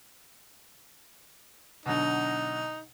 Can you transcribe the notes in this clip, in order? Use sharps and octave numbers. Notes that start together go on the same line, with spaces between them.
B2 D3 F#3 D#4